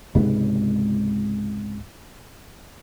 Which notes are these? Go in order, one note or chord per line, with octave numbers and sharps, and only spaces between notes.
C#2 G#2 C3 B3